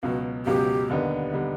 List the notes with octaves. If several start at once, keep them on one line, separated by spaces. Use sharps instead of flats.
C#2 B2 F#3 F#4
C#2 B2 F#3 G4
D#2 D3 G3 B3 D#4
D3 G3 B3 D#4